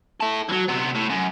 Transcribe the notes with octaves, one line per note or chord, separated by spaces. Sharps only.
E4 A4
E3 F#3
C3 B3
A2
F#2